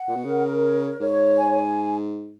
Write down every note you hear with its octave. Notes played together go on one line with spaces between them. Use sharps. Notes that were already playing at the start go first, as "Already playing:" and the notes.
Already playing: F#5
A#2
B2
C#3 A#4
C#5
G#2 C#5
G#5